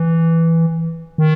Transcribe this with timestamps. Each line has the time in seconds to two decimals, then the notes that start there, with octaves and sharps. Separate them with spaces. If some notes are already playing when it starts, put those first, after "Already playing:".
Already playing: E3
1.18 D#3